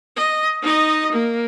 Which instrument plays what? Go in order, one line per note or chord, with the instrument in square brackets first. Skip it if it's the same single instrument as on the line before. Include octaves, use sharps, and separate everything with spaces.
[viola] D#5
D#4 D#5
A#3